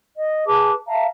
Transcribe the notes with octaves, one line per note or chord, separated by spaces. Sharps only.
D#5
G#4 B4 A5 D6
E5 F5 A5 A#5